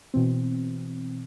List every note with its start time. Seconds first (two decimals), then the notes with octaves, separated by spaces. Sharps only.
0.14 B2 E3 C4